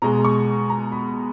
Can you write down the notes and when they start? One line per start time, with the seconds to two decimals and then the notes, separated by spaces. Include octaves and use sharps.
0.02 B2 G#3 A#5
0.25 C#6
0.70 A#5
0.92 B5